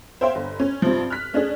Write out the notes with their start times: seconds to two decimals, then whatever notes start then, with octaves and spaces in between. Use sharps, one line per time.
0.21 C5 C#5 E5 F5 G5 C6
0.35 G1
0.60 C#4
0.82 G2 C3 F3
1.10 F6 F#6 B6
1.33 A3 C#4 D4 G#4